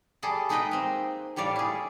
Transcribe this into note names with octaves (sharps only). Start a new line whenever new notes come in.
G3 G#4 A4 D5
G#3 D#4 G#4 B4 D#5 G5
A#3 C4
A2 G3 C#5 D5 F5
E4 G#4